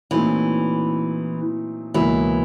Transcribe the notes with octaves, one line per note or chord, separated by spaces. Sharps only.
A#2 E3 F#3 A3 C4 D#4
C#2 B2 E3 F#3 A#3